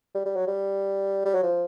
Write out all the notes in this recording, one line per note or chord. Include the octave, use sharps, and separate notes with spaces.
G3
G3
F#3
G3
G3
F#3
F3